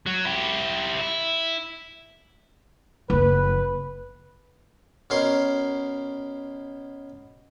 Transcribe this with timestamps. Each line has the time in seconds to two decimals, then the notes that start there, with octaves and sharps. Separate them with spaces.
0.06 F#3 F#4
0.25 E4 G4
1.01 E4
3.10 F#1 F2 B4
5.10 B2 C#4 A#4 C#5 C6